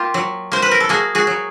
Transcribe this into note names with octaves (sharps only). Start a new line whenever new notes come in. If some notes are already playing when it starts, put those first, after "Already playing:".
Already playing: A#3 F4 G4
F#3
A#3 C5
B4
A#4
A4
A#3 F#4 G#4
F#4 G#4
F#3